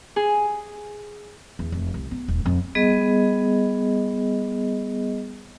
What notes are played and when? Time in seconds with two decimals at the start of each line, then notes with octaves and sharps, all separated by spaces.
0.16 G#4
1.59 E2
1.72 F1
1.94 C2
2.11 B3
2.28 D#1
2.46 F2
2.75 G3 B3 G#4 D#5